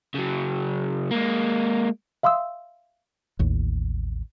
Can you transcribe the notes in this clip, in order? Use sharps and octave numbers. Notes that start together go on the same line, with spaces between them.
C#3 F#3
G#3 A#3
E5 F5 C6 D#6 E6
A1 D#2